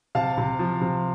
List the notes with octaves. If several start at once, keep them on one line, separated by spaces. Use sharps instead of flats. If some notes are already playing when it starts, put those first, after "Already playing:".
C3 F5 A5
C3
F3
C3